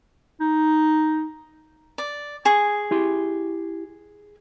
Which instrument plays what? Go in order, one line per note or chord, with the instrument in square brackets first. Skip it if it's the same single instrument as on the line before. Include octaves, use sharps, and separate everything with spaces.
[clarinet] D#4
[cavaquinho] D5
G#4 C#6
[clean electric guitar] E4 G4 C6